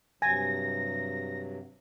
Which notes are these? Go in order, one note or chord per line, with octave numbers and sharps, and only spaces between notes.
G2 C3 F#3 G#5 A#6